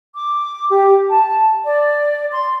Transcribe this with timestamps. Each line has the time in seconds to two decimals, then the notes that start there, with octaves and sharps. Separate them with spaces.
0.15 D6
0.70 G4
1.08 A5
1.64 D5
2.31 C6